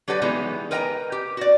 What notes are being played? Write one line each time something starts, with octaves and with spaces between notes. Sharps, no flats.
F#3 G4 A4 B4 D5
E3 F#3 G#3 B3 D#4 G4
A#4 B4 D#5 G5 G#5 A#5
G4
F#4 D5